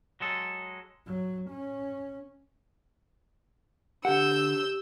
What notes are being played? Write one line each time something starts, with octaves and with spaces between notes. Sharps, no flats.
F#3 G#3 A4
F#3
C#4
D3 G4 F#5 E6 G6